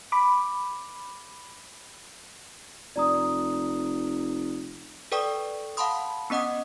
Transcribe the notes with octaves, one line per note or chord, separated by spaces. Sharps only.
B5 D6
F1 D5 A#5 D#6
A4 B4 D5 G5 C#6 D#6
F5 F#5 A5 B5 C6 D#6
B3 C#4 D#5 F#5 D#6